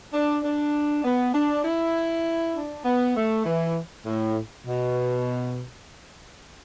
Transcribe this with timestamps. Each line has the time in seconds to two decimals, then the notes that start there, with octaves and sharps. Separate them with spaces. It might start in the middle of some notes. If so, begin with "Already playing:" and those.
0.13 D4
0.43 D4
1.04 B3
1.34 D4
1.64 E4
2.55 D4
2.85 B3
3.16 A3
3.46 E3
4.06 A2
4.66 B2